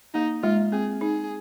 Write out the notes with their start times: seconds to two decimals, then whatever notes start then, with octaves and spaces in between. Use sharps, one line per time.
0.14 A#3 D#4
0.43 G#3 F4
0.72 C4 G#4
1.01 D#4 G#4